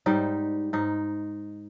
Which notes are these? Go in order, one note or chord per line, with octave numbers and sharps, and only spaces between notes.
G#2 G3 D#4
G#2 D#4